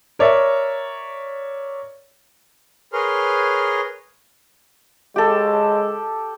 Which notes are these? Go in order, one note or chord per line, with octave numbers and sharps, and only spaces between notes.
A#4 C#5 D5 E5
G#4 A#4 B4 C#5 C6 F6
G#3 G4 A4